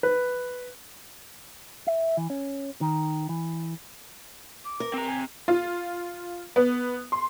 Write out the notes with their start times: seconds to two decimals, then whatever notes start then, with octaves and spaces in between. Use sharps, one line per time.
0.03 B4
1.87 E5
2.17 E3
2.30 C#4
2.81 D#3
3.29 E3
4.65 D6
4.80 A#4
4.94 C4 A#5
5.07 G#5
5.48 F4
6.56 B3
7.12 C6